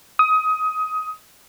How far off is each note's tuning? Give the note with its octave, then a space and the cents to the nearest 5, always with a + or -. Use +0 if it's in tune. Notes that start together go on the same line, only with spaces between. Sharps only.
D#6 +20